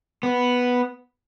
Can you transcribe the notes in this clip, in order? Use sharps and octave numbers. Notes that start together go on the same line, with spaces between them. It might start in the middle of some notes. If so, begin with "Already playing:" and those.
B3